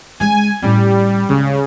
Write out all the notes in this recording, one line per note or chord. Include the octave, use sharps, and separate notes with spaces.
C#3 G#3 G#5
A2 G3 C#4
C#2 C#3